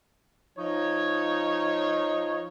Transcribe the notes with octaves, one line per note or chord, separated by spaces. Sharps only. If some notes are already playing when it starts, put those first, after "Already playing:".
F3 D#4 C#5